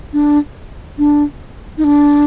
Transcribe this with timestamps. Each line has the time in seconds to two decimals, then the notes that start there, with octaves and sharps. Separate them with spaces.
0.13 D4
0.98 D4
1.78 D#4
1.84 D4